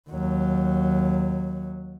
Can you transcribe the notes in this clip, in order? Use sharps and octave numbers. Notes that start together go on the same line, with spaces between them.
D#2 F#3